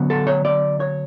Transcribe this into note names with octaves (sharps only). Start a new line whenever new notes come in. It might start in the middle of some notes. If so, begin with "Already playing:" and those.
Already playing: D3 F#3 B3
A4
C#5
D5
C#5